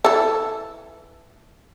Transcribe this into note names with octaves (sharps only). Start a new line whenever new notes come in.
E3 A4